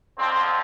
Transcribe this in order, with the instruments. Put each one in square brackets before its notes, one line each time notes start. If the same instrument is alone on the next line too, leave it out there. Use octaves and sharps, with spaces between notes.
[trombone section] F2 D3 F3 C4